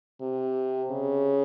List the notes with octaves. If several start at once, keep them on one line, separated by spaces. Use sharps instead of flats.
C3
C#3